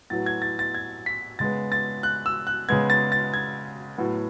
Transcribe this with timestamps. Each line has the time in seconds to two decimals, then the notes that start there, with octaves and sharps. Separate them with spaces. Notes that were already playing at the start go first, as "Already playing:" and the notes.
0.10 A2 F#3 B3 A6
0.26 G#6
0.42 A6
0.59 A6
0.74 G#6
1.06 B6
1.39 C#3 G#3 B3 A6
1.72 A6
2.03 F#6
2.26 E6
2.47 F#6
2.69 C#3 G#3 B3 G#6
2.90 A6
3.12 A6
3.34 G#6
3.98 A2 F#3 B3